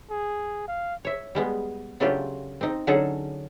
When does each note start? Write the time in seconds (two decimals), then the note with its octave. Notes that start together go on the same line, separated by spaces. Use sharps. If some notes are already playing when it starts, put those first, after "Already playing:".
0.10 G#4
0.68 F5
1.05 C#5 E5
1.35 G3 G#3 B3
2.00 C#3 F#3 A3 D4 F4 G4
2.61 C4 D#4
2.87 D3 F#3 C#4 D#4 G#4 A4